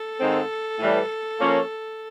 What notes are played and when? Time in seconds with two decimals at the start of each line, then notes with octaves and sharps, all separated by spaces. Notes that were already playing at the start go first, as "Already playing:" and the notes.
Already playing: A4
0.20 G#2 D#3 G#3 C4
0.79 A2 E3 G3
1.38 F3 A#3 C#4